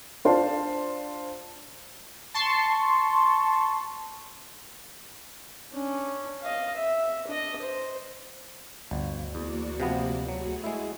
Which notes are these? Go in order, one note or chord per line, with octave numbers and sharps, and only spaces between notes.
D4 F4 C5 D5 F5 A5
A5 C6 C#6
C#4 D4
D#5 F5
E5
D4 D#5
C5
G1 D2
E2 A#3 F#4 D5
C3 F3 B3
F#3 A3 F#4 G#4
G#3 E4